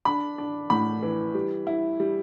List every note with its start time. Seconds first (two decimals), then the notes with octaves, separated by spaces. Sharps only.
0.05 D4 B5
0.38 D4
0.70 A2 B5
1.02 E3
1.34 G3
1.67 E4
2.00 G3